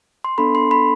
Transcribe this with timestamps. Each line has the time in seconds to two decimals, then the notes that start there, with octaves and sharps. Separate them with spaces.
0.24 C6
0.38 B3 D4 A4 B5
0.55 C6
0.71 B5